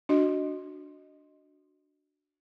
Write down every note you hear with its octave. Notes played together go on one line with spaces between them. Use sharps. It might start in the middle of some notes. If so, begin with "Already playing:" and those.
D4 F#4 D#5